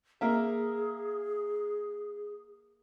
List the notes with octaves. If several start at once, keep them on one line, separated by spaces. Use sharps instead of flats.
A#3 G#4 E5